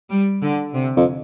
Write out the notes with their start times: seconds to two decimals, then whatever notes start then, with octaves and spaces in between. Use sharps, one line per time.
0.11 G3
0.42 D3
0.73 C3
0.97 F2